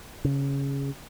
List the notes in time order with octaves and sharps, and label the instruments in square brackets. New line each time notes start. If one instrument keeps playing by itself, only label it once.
[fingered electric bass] C#3